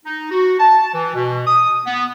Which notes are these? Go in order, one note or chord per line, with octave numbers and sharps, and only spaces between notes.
D#4
F#4
A5
E3
B2
D#6
B3